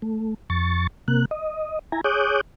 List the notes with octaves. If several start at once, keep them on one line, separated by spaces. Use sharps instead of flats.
A3
F2 C#6 A6
C3 A#3 F#6
D#5
E4 G#5 A#5
G#4 C#5 D6 D#6 F#6 G6